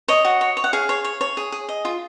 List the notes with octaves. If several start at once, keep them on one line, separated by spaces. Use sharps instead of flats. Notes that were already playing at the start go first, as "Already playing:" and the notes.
C#5 D#5
F#4
C#5
C#5
F#5
G#4 F5
C#5
C#5
C#5
G#4
G#4
D#5
F4